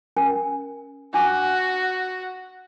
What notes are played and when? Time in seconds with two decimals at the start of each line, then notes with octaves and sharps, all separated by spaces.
0.16 C#4 A#4 G#5
1.14 D4 F#4 G#5 D6